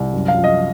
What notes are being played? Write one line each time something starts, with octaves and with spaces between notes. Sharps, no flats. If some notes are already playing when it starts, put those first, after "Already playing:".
Already playing: C2
F#2
F5
F3
D#5